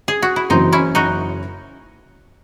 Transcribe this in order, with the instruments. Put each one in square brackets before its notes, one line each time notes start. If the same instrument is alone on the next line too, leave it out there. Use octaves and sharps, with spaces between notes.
[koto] G#4
F#4
E4
[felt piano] F#1 F#2 E3 [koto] C4 D#4
[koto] C#4 E4
D#4 F#4